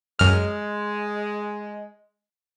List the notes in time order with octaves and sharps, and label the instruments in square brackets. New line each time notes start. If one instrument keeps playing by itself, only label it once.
[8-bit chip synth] F#2 F6 [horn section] G#3